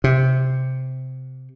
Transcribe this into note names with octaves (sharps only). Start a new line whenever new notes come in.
C3